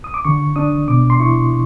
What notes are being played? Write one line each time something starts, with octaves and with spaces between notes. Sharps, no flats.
D#6
D6
D3 C#6
D4 D#6
B2 D6
C6
E4 C#6